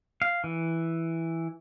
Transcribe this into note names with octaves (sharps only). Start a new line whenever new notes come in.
F5
E3